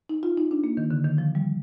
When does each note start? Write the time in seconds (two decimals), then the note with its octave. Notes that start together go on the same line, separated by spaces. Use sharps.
0.09 D#4
0.23 F4
0.37 D#4
0.51 D4
0.64 A#3
0.77 D#3
0.91 D3
1.05 D#3
1.18 F3
1.35 G3